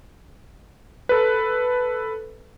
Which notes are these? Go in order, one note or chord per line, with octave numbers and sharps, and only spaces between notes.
A4 B4